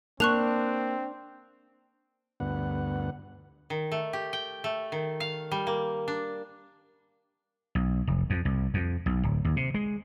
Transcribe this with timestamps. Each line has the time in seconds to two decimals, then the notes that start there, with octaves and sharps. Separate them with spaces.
0.20 A#3 C4 D4 C#6 F#6 F7
2.40 D2 G2 B3 F#5
3.70 D#3
3.92 A3
4.13 G4
4.33 G5
4.64 A3
4.92 D#3
5.20 F5
5.52 G3
5.67 A#3
6.08 D4
7.75 B1
8.07 F1
8.30 F2
8.45 C2
8.74 F2
9.06 B1
9.23 D1
9.45 D#2
9.57 C3
9.74 G#3